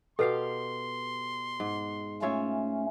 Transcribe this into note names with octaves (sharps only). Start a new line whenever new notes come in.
B2 G4 A4 B4 F5 C6 C7
G#2
A3 C#4 F4 C#5 E5